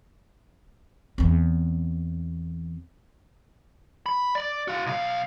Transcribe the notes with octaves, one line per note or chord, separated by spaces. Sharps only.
E2 C4
B5
D5
F#4 F5
B1 F5